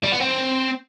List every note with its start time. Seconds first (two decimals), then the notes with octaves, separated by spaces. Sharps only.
0.03 G3
0.12 B3
0.20 C4